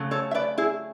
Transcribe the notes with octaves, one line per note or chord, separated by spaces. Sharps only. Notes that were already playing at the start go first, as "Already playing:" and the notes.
Already playing: C#3 F#3 A3
A4 C#5
E5
B4 D5
E4 G#4